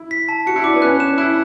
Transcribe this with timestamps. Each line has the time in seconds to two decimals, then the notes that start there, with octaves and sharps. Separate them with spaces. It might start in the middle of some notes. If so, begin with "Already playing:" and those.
Already playing: E4
0.11 B6
0.29 A5
0.47 F#4 C#7
0.56 E4
0.64 D4 D6
0.74 B3
0.82 C#4 F#6
1.00 E7
1.18 E4 F#6